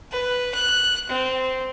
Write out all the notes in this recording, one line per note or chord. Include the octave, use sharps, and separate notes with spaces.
B4
F#6
C4